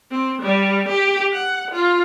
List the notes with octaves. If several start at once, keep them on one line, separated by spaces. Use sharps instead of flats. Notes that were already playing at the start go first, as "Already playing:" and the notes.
C4
G3
G4
F#5
F4